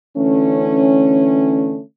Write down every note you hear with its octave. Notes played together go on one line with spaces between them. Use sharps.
D3 E3 A3 C#4